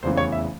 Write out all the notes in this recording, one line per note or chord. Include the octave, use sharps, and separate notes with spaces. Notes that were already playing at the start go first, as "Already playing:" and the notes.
F1 E2 C#3 E3 C5
C#5
E5